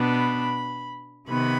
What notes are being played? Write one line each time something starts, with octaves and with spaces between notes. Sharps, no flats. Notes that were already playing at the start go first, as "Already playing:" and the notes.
Already playing: B2 B3 D4 B5
C3 D#3 B3 B5